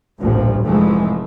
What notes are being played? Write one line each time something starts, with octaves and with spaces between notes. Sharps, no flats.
A1 D2 G2 A#2 F3
F1 G#2 E3 F3 G#3 A3